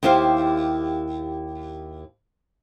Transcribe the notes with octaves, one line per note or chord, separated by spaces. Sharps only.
D#2 E4 G4 C5 F5